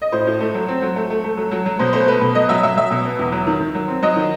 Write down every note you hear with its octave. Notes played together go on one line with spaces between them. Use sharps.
D#5
A2 C5
A2
A3
F#3
C4
F#3
A3
A3
A3
F#3
F#3
F#3
B2 C5
A3 C5
A3 B4
B2
F#3 D#5
F#3 E5
F#3 E5
F#3 E5
B2
B3
E2
F#3
D#3
D#3
F#3
C4
F#3 D#5
D#3